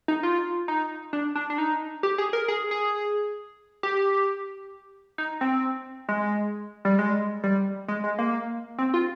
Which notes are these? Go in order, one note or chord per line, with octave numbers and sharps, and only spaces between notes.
D#4
F4
D#4
D4
D4
D4
D#4
G4
G#4
A#4
G#4
G#4
G4
D#4
C4
G#3
G3
G#3
G3
G#3
G#3
A#3
C4
F4